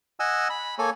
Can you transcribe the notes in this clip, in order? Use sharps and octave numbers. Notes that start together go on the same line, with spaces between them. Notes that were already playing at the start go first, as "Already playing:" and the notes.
D#5 F#5 G#5 E6
B5
A#3 A4 C#5 G#5